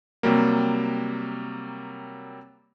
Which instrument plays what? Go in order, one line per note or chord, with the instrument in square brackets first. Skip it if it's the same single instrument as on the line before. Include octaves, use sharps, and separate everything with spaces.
[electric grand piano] C3 F#3 G3 A#3